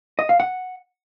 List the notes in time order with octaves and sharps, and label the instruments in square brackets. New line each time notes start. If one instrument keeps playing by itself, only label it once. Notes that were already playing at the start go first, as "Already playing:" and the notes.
[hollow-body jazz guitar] D#5
F5
F#5